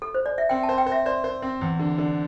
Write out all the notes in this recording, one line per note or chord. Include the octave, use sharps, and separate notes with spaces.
A4
C5
D5
E5
C4 G5
A5
C5
G5
C5
E5
C5 D5
C5
C4
E2
D3
D3